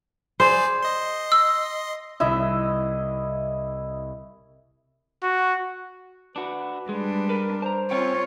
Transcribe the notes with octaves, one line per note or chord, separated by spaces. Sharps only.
G#4 C5 D5 G#5
D#5 C6
E6
C2 E4 D#5 E5
F#4
D4 F#4 B4
G3 G#3 D4
A#4 B4
C5 A5 A#5
C4 C#4 F4 C#5 G5